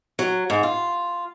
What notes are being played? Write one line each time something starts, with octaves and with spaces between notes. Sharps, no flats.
F#3
G#2
F4